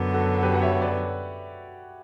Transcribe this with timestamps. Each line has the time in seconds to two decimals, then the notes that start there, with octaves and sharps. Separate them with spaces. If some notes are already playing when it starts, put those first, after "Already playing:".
Already playing: F#2 D3 F#3 B3
0.14 F#4 A4
0.43 G4 B4
0.54 F#5
0.62 C#5 E5
0.81 B4 D5